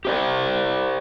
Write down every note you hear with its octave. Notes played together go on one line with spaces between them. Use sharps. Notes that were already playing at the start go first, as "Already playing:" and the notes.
G4 C5 D5